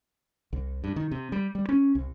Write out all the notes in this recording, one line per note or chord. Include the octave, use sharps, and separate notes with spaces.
C2
G2
D#3
C3
G3
G3
C#4
C2